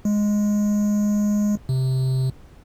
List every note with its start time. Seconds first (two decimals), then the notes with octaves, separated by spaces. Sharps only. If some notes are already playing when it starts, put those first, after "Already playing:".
0.05 G#3
1.69 C3